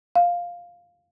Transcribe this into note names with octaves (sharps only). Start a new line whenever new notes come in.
F5